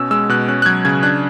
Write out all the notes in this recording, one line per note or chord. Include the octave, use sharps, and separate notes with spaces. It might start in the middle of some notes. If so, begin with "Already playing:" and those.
Already playing: B2 C#4 E6
G#3 E6
B2 F#6
C#4 F#6
F#6
F#3 G#6
C#3 G#6
D4 F#6